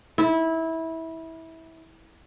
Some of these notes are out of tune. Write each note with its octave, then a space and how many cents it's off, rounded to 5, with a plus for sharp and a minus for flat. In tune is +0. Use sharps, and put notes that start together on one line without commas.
E4 -20